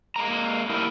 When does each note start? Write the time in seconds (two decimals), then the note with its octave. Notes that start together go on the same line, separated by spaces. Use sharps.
0.16 G#3 A#3 A#5
0.70 A#3 D4 E4 G4 A#4